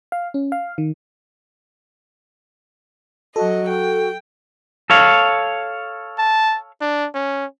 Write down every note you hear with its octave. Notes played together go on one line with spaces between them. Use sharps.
F5
C#4
F5
D#3
F#3 F#4 A4 D#5
G5
A4 C#5 F5
A5
D4
C#4